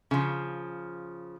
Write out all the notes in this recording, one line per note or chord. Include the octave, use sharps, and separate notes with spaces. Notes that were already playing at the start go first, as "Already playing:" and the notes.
C#3 F3